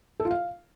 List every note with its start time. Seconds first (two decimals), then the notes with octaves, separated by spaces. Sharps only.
0.20 A4
0.25 F4
0.31 F5